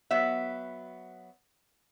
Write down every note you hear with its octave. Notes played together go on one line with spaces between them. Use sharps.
F#3 B3 E5